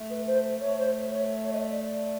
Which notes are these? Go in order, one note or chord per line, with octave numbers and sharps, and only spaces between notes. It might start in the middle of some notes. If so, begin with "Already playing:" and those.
Already playing: A3
B4
C5
A3 C#5
C5
C#5
C#5
D#5
D5
D5